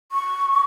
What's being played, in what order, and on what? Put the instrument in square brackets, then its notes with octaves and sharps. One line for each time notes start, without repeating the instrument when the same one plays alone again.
[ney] C#6